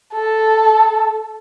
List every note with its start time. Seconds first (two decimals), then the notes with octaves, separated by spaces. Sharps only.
0.15 A4